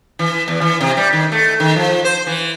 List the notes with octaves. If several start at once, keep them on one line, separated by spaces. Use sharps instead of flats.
E3
E2
E3
C3
G3
D#3
A3
D#3
F3
C5
E3